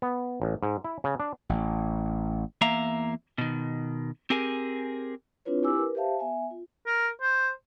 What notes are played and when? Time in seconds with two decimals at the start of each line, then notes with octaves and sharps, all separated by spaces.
0.02 B3
0.42 A1
0.63 G#2
0.84 E4
1.04 C#3
1.20 D4
1.49 A1
2.61 E2 A#3 E5 F5 A#5
3.38 B2 D#3
4.30 C4 G4 G#4 A#4 G#5
5.45 C4 D4 E4 F4 B4 C#5
5.63 E4 G4 G#5 D6 E6
5.77 A#4 B4
5.95 G4 C5 E5 F5 A5
6.19 B3 E5 G#5
6.51 F4
6.86 A#4
7.21 C5